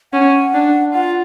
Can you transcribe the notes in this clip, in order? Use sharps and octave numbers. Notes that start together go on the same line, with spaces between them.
C#4 F#5
D4
F4 F#5